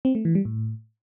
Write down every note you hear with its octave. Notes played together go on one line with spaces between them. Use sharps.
C4
A3
E3
G3
A2